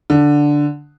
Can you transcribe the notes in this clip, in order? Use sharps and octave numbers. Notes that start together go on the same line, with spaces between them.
D3